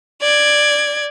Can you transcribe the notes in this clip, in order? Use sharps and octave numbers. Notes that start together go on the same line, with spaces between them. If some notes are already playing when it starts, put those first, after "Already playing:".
D5 G#6